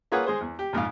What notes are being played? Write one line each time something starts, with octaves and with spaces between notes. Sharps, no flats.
A#3 F4 G#4 B4 C#5 F#5
G#3 G#4 C5
E2
G4
A#1 F2 G#2 F5